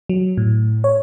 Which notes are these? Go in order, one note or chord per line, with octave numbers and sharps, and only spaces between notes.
F#3
A2
C#5